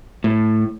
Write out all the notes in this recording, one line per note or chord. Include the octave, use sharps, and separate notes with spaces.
A2